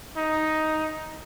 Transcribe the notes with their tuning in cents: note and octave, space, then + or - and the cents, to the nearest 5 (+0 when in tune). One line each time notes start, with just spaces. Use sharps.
D#4 +5